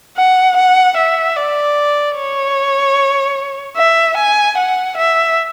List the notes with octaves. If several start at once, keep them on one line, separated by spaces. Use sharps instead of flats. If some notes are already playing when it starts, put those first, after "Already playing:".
F#5
F#5
E5
D5
C#5
E5
G#5
F#5
E5